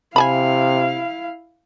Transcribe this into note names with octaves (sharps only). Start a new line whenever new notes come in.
C3 E4 F5 G#5 A5 B5